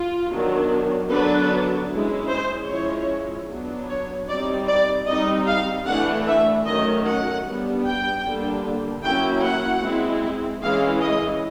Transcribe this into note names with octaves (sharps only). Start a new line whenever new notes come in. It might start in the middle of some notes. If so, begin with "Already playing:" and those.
Already playing: F4
D#3 F#3 B3 D4
D3 F#3 B3 D4 B4
G#3 C#4 E4
C5
F3 G#3 C#4 E4 C#5
F#3 B3 D4
C#5
G3 C4 D#4 D5
D5
G3 C4 D#4 D#5
F5
E3 A3 D4 F#5
E5
D#3 F#3 A3 C#4 D#5
F#5
G3 B3 D4
G5
D3 G3 A#3 D4
F#3 A#3 C#4 E4 G5
F#5
G#3 C4 E4
E3 G#3 C#4 E4 F5
D#5